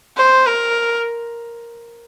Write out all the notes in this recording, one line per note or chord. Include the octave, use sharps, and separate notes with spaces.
C5
A#4